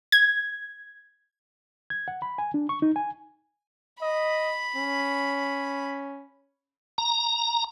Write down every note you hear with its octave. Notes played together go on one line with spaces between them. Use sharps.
G#6
G#6
F#5
B5
G#5
D4
C#6
D#4
G#5
D#5 B5
C#4
A#5